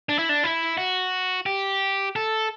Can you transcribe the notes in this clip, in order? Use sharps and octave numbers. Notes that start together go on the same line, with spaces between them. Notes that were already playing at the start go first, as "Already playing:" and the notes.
D4
E4
D4
E4
F#4
G4
A4